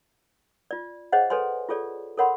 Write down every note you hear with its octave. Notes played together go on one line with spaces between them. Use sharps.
F4 D5
G#4 C5 C#5 D#5 F5 F#5
A4 B4 C#5 G#5 C6
F4 G#4 A4 C#5 D5
A4 A#4 C#5 F#5 B5 C6